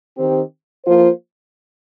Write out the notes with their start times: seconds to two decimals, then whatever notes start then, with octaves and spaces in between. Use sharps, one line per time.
0.16 D#3 C4 G4
0.86 F3 A#3 F4 C5